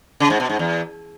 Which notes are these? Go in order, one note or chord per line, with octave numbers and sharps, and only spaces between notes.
C#3
G#2
B2
G#2
E2